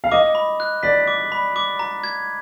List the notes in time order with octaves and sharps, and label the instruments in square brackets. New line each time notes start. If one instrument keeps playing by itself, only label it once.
[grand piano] F5
[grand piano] D#5 [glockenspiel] D6
[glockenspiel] B5
F#6
[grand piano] D5 [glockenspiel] B6
[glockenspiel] D6
B5
D6
A#5
G#6